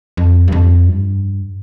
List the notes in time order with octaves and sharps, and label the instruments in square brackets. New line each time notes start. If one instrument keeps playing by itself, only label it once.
[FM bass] F2
G2
F2
G2